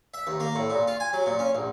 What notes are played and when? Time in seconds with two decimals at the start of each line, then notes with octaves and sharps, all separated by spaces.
0.14 E5
0.27 D#2
0.40 A#3
0.55 A2
0.70 A#2
0.88 F4
1.00 G#5
1.13 F#3
1.26 A#2
1.39 C#4
1.55 A#1